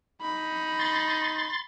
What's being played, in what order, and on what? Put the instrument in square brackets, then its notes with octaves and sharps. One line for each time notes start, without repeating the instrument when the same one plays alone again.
[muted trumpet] D#4 [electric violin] B5
[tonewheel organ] C6 A6